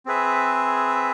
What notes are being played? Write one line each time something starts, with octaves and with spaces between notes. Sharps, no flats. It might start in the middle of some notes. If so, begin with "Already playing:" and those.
C4 G#4 B4 E5